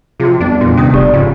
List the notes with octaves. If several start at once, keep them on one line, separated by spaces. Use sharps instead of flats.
C3 F3 F#4 G#4
G1 F2 D4
E2 A#2 F#4
C3 D#3 C#4 D#6
F1 G4 D5
F2 G#2 C#3